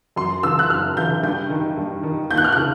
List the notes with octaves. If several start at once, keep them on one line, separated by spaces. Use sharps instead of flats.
F#2 C6
C#3 E3 E6
F#6
F#2 F6
C#3 E3 G6
G2 G6
D#3
G2
D#3
D#2 G6
F#6
F6
C#3 F#6